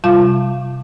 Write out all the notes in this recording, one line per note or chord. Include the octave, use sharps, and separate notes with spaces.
C3 G3 F4 F5 A5 D6